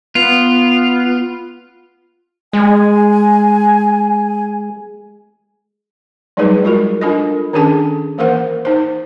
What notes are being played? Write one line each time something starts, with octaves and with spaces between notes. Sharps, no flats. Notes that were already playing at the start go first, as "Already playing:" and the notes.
B3 F4
G#3 G#5
F#3 G3 A3 D#4 G#4 B4
G#3 F4 F#4 A#4
D4 F4 A4 A#4 D#5
D#3 C#4 D4 G#4 A4 A5
E3 A#3 A#4 C5 F#5
D#4 C5